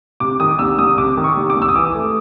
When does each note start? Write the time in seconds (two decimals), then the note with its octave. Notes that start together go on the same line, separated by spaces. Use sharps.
0.20 C3 D6
0.40 D#3 D#6
0.59 C2 E6
0.78 C2 D#6
0.98 C3 D6
1.17 D#3
1.24 C#6
1.37 C2
1.50 D6
1.56 C2
1.62 E6
1.69 D#6
1.75 E3 D6
1.95 A3